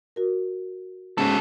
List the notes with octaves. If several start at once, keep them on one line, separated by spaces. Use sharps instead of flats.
F#4 A#4
G#2 C#3 F#4 A4